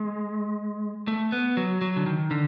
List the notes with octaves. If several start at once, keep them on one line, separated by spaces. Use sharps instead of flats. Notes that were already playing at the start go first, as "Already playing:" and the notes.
Already playing: G#3
A3
B3
F#3
F#3
D3
D#3
D3